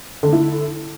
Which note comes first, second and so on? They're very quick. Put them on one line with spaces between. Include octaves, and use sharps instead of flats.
D3 A3 E4